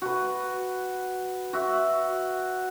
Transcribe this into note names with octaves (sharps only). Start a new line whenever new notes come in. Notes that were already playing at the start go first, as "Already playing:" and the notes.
F#4 B4
F#4 E5